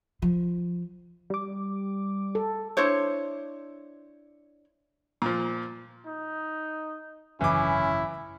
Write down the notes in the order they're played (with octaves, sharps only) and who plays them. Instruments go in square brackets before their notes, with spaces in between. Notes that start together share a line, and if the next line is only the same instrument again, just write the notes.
[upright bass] F3
[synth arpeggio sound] G3 D6
[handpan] A4
[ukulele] D4 E4 C5 C#5
[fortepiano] A#2 F3
[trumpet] D#4
[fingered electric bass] G#1 F#2 C#3 [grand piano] E3 D6 [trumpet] C#4 [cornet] E4